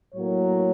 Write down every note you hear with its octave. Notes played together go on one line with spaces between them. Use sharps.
A2 F#3 A#3 C#5